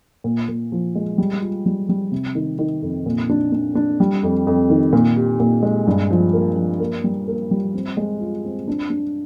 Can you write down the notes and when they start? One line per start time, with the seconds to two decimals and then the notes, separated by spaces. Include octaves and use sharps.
0.24 A#2
0.49 A#2
0.72 F3
0.95 G#3
1.18 G3
1.42 F4
1.66 G3
1.89 G3
2.12 C3
2.35 D#3
2.59 D#3
2.82 F2
3.06 A#2
3.30 D4
3.52 D4
3.75 D4
4.00 G3
4.23 F2
4.47 F2
4.70 D#3
4.93 A#2
5.16 G4
5.40 A#2
5.63 G#3
5.87 G2
6.11 F3
6.33 A#3
6.56 F3
6.80 A#3
7.04 G3
7.28 A#3
7.51 G3
7.74 C4
7.97 G#3
8.21 F4
8.45 C4
8.68 D4
8.90 D4